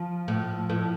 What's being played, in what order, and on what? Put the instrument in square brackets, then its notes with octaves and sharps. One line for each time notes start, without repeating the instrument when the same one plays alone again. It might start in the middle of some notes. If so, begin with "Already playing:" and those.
Already playing: [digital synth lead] F3
[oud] A2
A2